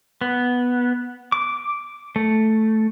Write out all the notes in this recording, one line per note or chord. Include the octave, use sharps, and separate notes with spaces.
B3
D6
A3